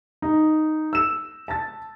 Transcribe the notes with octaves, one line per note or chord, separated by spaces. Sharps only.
D#4
E6 E7
A5 A6